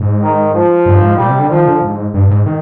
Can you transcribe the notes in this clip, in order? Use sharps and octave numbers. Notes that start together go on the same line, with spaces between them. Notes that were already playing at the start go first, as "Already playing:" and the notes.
Already playing: G#2
D#3
F3
G2
G#2
A#2 G3
C3
D3
D#3 F3
D3
G#2
G2
G#2
D#3